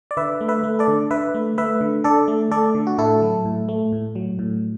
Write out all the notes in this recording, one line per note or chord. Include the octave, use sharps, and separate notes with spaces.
D5
D3 B4 E5
A3
B4 E5
A3
A4 D5
D3
D3 B4 E5
A3
A3 B4 E5
D3
D3 A4 D5
A3
A3 A4 D5
D3
F#4
A2 E4 A4
F#3
A2
A3
A2
F#3
A2